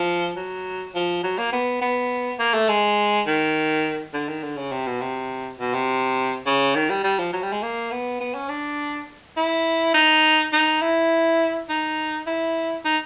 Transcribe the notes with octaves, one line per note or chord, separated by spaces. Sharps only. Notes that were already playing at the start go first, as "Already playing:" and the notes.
Already playing: F3
F#3
F3
F#3
A#3
B3
B3
A#3
A3
G#3
D#3
D3
D#3
D3
C#3
C3
B2
C3
B2
C3
C#3
D#3
G3
G3
F3
F#3
G3
G#3
A#3
B3
B3
C#4
D4
E4
D#4
D#4
E4
D#4
E4
D#4